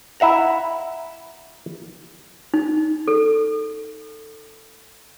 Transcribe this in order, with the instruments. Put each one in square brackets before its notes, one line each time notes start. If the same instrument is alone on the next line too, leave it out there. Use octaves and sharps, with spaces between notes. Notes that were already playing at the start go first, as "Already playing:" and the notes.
[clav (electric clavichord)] E4 E5 F#5 A#5
[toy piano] D#4
A4